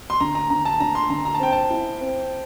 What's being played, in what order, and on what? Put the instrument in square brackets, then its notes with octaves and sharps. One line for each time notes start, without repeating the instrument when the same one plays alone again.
[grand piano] C6
[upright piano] D3 [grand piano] A#5
[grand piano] A#5
[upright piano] D3 [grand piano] A#5
[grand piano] A5
[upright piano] D4 [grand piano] A#5
[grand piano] C6
[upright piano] D3 [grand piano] A#5
[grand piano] A#5
A5
[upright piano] C4 [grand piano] G5
[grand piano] A5
[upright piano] E4
C4